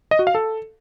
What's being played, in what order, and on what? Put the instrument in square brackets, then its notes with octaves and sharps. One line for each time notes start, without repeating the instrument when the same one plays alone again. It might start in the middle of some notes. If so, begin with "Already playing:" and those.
[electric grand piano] D#5
F#4
F5
A4